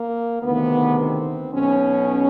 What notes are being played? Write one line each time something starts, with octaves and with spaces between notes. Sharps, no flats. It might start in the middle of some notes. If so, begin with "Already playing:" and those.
Already playing: A#3
D2 C3 D#3 B3
C4
B1 B2 C#4